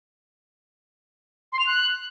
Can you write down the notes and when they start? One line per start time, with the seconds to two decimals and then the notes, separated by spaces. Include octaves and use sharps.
1.52 C6
1.59 F7
1.66 F#6